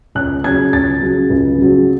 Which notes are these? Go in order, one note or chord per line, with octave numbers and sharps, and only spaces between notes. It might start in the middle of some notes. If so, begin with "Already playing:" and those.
C#2 F#6
C#3 F#3 G#6
C#2 A6
C#3 F#3
C#2
C#3 F#3